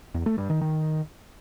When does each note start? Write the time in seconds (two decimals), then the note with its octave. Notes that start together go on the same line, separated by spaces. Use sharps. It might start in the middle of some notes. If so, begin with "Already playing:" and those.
0.14 E2
0.26 A3
0.38 G2
0.50 D#3
0.61 D#3